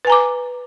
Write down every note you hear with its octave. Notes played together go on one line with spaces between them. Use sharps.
B4 G#5 A#5 D6